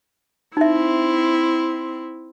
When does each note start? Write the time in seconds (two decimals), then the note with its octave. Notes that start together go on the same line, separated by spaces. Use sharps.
0.57 C4 D#4 E4 E5